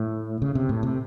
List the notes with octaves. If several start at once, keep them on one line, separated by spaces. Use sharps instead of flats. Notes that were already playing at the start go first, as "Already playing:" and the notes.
Already playing: A2
C#3
C3
A2
C3